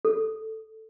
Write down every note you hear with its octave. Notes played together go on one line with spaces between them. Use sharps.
A4